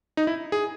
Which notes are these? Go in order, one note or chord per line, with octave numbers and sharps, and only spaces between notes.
D#4
E4
G#4